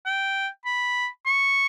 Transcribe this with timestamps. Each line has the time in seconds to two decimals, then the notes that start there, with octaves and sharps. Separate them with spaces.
0.06 G5
0.65 B5
1.26 C#6